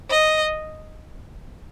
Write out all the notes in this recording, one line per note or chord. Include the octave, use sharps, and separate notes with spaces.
D#5